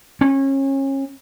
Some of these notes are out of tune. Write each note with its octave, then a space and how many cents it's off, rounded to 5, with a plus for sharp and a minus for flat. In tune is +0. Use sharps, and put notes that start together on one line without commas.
C#4 -30